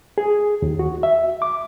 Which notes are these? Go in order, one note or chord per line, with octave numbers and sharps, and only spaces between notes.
G#4
D#2
F#4
E5
D6